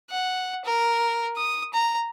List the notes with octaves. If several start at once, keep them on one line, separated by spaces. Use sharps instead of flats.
F#5
A#4
D#6
A#5